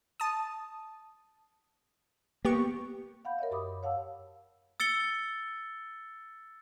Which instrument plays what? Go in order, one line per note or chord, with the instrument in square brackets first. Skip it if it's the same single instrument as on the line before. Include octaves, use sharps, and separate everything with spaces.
[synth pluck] A5 D#6
[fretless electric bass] A#3 [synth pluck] B3 G4 C#6
[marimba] F5 F#5 B5 G6
A#4 C#5 D#5 E5
F#2 G4 B5 D6 D#6
C#5 F5 F#5 A5 E6
[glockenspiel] E6 A6 C#7 G7